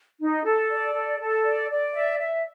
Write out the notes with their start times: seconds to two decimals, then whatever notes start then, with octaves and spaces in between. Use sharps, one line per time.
0.19 D#4
0.45 A4
0.70 D5
0.94 A4
1.19 A4
1.44 D5
1.69 D5
1.94 E5
2.19 E5